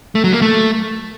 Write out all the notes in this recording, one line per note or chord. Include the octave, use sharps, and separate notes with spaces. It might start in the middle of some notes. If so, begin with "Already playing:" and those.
A3
F#3
A#3
A3